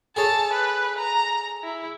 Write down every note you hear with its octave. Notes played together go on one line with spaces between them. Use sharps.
G#4 A4 C#5 A5
B4
A#5
E4